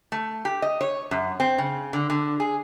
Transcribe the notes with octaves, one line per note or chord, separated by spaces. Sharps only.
A3
G4
D#5
C#5
F#2
C4
C#3
D3
D3
G#4